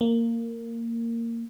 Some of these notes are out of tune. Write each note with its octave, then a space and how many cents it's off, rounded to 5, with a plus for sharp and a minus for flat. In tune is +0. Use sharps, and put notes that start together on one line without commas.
A#3 -15